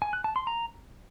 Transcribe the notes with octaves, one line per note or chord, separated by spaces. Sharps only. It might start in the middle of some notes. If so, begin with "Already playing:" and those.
G#5
F#6
A5
C6
A#5